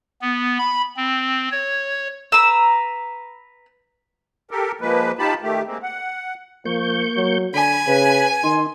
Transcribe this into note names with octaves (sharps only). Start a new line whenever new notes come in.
B3
B5
C4
C#5
B4 A#5 E6
G4 A4 A#4
F3 G#3 A#3 B4
D#4 F4 G4 A5 B5
D#3 A3 G4
G#3 A#3 C4
F#5
F3 A#3 C#6 G6
F#3
D3 G#5 B5
C#3 B4
D#3 D#4 C6